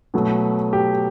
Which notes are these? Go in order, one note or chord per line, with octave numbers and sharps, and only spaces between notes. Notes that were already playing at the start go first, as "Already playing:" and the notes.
B2 F#3 A3
G4